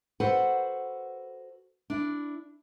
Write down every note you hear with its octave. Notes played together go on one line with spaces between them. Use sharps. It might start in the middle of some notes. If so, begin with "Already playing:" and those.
F#4 A4 B4 C5 F#5
D4 E4